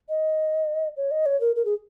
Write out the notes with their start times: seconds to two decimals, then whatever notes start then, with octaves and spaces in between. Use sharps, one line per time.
0.09 D#5
0.97 C#5
1.11 D#5
1.26 C#5
1.41 A#4
1.56 A#4
1.65 G#4